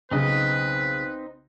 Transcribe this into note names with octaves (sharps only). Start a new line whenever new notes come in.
B1 C#3 C4 D#4 B4 D#5